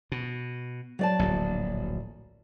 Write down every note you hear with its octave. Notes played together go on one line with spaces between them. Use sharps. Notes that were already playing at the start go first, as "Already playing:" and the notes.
B2
F#3 D5 A5
D1 A#1